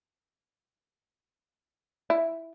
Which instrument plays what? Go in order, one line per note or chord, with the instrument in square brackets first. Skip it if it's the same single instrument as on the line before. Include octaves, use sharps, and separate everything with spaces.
[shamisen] E4